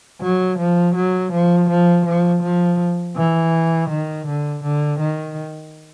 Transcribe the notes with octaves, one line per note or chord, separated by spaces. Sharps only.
F#3
F3
F#3
F3
F3
F3
F3
E3
D#3
D3
D3
D#3